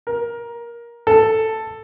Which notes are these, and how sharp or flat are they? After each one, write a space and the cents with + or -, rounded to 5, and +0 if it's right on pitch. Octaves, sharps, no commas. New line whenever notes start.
A#4 +15
A4 +5